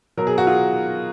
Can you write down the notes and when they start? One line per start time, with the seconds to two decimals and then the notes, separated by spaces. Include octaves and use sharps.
0.17 B2 F#3 A#4
0.27 G#4
0.38 F#4
0.47 F4 G#4